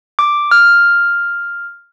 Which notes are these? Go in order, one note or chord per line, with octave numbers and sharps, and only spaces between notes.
D6
F6